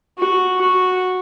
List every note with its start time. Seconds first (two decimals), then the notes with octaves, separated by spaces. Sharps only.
0.18 F#4
0.61 F#4